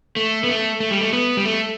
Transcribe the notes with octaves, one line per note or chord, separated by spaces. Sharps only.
A3
B3
A3
A3
G3
A3
B3
G3
A3